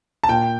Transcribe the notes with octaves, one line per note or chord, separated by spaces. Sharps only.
A5
A#2 G5